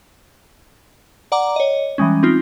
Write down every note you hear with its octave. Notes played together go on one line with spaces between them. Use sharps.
D5 F#5 A#5 D6
C#5 D#5
E3 G3 G#3 C#4
C4 D#4 F4